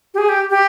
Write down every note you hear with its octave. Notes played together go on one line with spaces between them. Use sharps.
G4
G#4
G4
G4